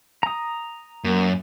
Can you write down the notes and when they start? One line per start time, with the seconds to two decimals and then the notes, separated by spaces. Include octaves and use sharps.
0.23 A#5 D#6
1.04 F#2 A#3